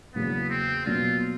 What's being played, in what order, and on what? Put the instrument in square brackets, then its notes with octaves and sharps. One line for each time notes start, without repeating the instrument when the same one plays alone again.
[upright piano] E2 C#3 F#3 A#3 [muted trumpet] B3
[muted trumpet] C4
[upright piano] B2 F#3 A#3 D4 [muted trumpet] F4